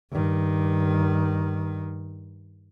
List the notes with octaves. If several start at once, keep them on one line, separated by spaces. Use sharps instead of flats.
G2 D#3